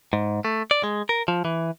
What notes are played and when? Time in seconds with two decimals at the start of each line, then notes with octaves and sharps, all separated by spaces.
0.13 G#2
0.44 A3
0.71 D5
0.83 G#3
1.09 A#4
1.28 F3
1.45 E3